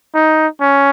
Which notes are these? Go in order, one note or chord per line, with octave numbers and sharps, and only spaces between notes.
D#4
C#4